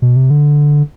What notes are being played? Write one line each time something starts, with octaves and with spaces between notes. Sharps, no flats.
B2
C3
D3